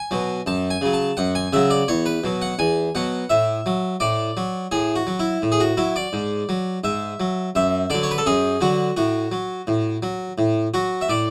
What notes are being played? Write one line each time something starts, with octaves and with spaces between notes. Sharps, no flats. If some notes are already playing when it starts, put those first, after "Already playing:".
Already playing: G#5
B2 F#3
F#2 A5
G#5
C#3 F#3
A5
F#2 F#5
G#5
C#3 F#3 E5
D5
E2 C#5
B4
B2 F#3
F#5
E2 G#5
B2 F#3 F#5
A2 E5
F#3
A2 D5
F#3
A2 G#4
F#4
F#3
E4
A2
G#4
F#4
F#3 E4
D5
G#2
F#3
G#2 E5
F#3
F#2 E5
D3 F#3 D5
C#5
B4
A4
F#2 G#4
D3 F#3 F#4
A2 F#4
F#3
A2
F#3
A2
F#3 F#4
E5
A2 D5